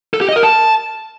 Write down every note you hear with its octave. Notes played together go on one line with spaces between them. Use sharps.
A4
G4
D#5
A#4
A5